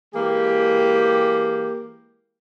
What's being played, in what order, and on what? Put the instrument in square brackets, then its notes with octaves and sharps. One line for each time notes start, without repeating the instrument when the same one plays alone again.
[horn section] E3 G#3 A#3 G4